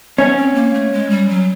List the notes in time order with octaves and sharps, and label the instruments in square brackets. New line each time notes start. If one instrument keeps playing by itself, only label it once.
[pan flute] B3 [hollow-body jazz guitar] C#4
[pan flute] C4
A#3
A3
G#3
G3
F#3